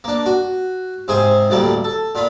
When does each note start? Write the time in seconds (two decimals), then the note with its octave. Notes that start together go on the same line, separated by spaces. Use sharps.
0.04 A#3 D4
0.26 F#4
1.08 G#2 C3 G#4 C5 G#5
1.50 A1 D2 G3 A#3 A4
1.84 A4
2.15 A#2 F4 B5